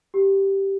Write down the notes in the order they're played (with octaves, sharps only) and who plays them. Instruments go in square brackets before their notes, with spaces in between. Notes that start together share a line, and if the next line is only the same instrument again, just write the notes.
[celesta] G4